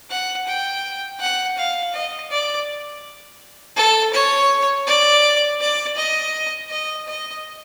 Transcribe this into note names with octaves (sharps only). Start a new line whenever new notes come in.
F#5
G5
F#5
F5
D#5
D5
A4
C#5
D5
D5
D#5
D#5
D#5